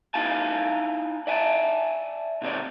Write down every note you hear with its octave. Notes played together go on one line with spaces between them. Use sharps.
D#4 E4 F5 G#5 A5
D5 E5 G#5 A5
B2 D#3 C4 C#5 D5